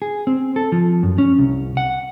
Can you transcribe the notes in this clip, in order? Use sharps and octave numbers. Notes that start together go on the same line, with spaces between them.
G#4
C4
A4
F3
F#2
C#4
C2
F#5